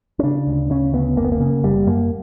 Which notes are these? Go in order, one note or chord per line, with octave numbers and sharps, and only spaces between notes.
C#4
C#3 D4
D2
C#3 C#4
D2 B3
F#1 A#3
B3
A#3
C#3
F#1 G3
F#2 A#3